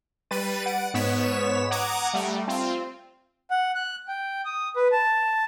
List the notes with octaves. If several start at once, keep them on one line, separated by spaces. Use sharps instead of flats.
G3 B4 A6 D#7
F#5 D7
G#2 B3 C#5 B6 E7
F#5 A#5 D6 D#6 G#6
G3 A3
C4 F4
F#5
F#6
G5
D#6
B4
A5